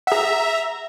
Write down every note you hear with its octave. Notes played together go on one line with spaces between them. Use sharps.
G#4 E5 F#5 A#5